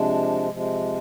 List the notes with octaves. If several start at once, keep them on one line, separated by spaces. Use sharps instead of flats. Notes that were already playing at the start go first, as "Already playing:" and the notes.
Already playing: C3 F3 G#3 D4
C3 F3 G#3